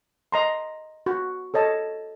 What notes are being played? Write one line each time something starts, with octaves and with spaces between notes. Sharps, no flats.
D#5 A#5 C6
F#4
A4 C#5 D#5 A5